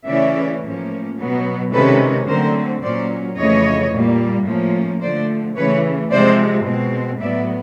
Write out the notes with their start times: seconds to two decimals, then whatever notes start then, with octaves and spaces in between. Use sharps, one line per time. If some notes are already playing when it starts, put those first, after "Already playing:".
0.09 C#3 E3 A3 C#4 D5 E5
0.64 A2 F3 A#3 C#4
1.19 B2 F#3 B3
1.73 C3 D#3 G#3 C#4 A4 B4
2.28 D3 F#3 A3 C4 A#4 C5
2.83 A#2 F#3 A#3 C#4 C5 D5
3.37 F2 C#3 E3 A3 C#5 D#5
3.92 A#2 G3 A#3
4.47 A2 F3 A#3 C#4
5.02 D3 F3 A3 C5 D5
5.57 C#3 E3 A3 C#4 B4 C#5
6.11 C3 F3 G#3 C4 C5 D5
6.66 B2 G#3 C4
7.21 A2 F#3 B3 D5 E5